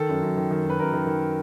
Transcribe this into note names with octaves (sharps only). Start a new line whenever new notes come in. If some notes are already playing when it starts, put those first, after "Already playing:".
Already playing: D#3 A4
F#2
F#2
D#3
D#3
F#2 B4
F#2 A#4
D#3
D#3